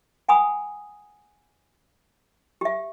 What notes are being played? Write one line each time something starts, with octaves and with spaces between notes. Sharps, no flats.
F#5 G#5 B5 D#6
G4 E5